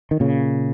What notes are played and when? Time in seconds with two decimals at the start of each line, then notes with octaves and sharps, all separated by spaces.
0.11 D#3
0.20 A#2 C#3